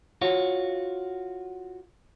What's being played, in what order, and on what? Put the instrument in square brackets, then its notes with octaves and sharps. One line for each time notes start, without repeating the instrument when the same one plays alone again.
[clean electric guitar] F4 F#4 C#5